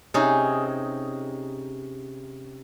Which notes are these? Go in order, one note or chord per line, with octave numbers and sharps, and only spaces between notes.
C3 C#4 D#4 G#4